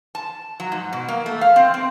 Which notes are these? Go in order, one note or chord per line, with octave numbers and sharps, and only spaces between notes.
A5
F#3
G#2
B2
A#3
A3
F5
C4
C4